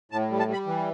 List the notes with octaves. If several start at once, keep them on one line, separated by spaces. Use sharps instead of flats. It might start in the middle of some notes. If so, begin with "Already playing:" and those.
A2 A5
G3
A5
G3
B5
E3